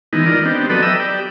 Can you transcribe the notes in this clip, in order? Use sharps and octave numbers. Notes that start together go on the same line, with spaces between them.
D#3 E3 G#3 B3 D#4
F4 A#4 D5 D#5
B3 C4 D4 G4
F#3 B3 A4 B4 D5 D#5
E5 G5 A#5 B5 D#6 E6
G4 D5